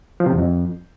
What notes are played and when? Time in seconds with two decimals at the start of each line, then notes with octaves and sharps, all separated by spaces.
0.20 F3
0.26 C3
0.32 E2
0.38 F2